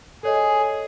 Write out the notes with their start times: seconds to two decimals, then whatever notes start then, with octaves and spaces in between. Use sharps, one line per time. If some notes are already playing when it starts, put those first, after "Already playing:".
0.23 G#4 A4 C#5 D#5